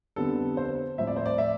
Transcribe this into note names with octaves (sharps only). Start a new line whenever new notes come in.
F2 D3 G3 B3 A4
C5
A2 F3 C4 E5
D5
C5
D5
E5